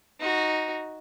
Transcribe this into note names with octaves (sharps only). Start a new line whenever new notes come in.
D#4 F#4